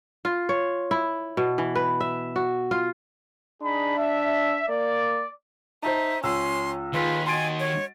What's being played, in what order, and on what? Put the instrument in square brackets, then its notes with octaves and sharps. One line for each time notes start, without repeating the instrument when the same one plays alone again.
[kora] F4
C#5
E4
B2
E3
B4
E5
F#4
F4
[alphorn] D4 [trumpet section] D#4 G#4 B5
[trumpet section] E5
[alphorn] A#3 [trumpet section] D5
[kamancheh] D#4 [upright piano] C5 A5 [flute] E5
[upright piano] C#2 E6 [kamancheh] C#4 [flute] C6
[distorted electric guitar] D#2 [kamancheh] F4 G#4 [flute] B4
[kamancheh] F#4 D#5 [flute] G#5 [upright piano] C6 A6 D7
[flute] C#5